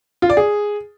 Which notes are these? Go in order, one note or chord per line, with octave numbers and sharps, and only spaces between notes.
F4
D5
G#4